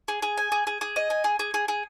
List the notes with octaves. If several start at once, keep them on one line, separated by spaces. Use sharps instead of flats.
G#4
G#4
G#5
G#4
G#4
G#4
D#5
G#5
G#4
G#4
G#4
G#4